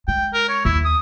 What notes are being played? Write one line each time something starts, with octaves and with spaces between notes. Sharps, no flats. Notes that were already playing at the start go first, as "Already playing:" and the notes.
G#3 G5
A#4
C#5
D#2 E4
D#6